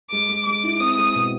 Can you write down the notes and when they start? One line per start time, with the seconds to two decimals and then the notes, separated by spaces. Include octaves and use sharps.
0.11 G#3 D6
0.29 G#3
0.46 G#3 D6
0.63 E4
0.80 C4 D#6
0.98 G#3
1.15 B2